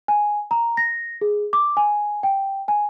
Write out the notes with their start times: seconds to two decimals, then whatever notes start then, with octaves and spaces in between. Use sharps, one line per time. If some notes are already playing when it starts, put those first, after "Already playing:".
0.08 G#5
0.51 A#5
0.77 A#6
1.21 G#4
1.53 D6
1.77 G#5
2.23 G5
2.68 G#5